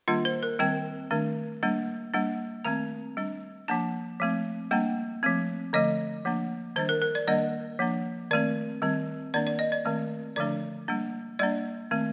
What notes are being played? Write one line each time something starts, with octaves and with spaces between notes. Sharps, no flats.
D#3 G3 A#3 D4 F4
C5
A#4
D#3 G3 C4 G5
D#3 A3 D4
G3 A#3 D4
G3 A#3 D4
D#3 A3 C4 A#5
G3 D4
F3 A#3 D4 A5
F3 A3 C4
G3 A#3 D4 G5
F3 A3 C4
D3 F3 A3 D#5
F3 A#3 D4
D#3 G3 D4 C5
A#4
A#4
D5
D#3 G3 A#3 D4 D#5
F3 A#3 D4
D#3 A3 C4 D5
D#3 G3 C4
D#3 A#3 D4 D5
D5
D#5
D5
D#3 A3 C4
D3 F3 A3 D4 D5
G3 A#3 D4
G3 A#3 D4 D5
D#3 A3 C4